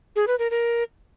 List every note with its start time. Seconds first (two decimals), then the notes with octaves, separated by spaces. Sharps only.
0.16 G#4
0.27 B4
0.39 A#4
0.51 A#4